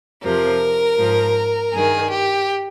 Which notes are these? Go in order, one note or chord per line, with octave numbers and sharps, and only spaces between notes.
F2 C3 F3 A#4
G#2 F3
G2 D#3 G#4
G4